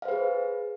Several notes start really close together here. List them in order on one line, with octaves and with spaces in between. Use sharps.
F5 C5 B4 G#4